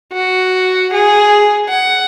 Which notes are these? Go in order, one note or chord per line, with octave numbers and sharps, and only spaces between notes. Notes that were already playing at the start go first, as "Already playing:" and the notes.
F#4
G#4
F#5